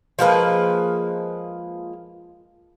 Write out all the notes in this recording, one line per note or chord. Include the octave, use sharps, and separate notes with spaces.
F3 G#3 A#3 B4